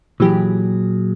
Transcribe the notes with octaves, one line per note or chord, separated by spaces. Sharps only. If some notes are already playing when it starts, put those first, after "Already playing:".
A#2 E3 F#3 G4 G#4